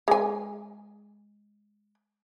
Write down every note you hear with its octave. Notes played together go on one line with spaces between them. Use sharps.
G#3 G#5